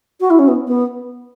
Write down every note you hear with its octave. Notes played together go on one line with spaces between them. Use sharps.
F#4
E4
C#4
B3
B3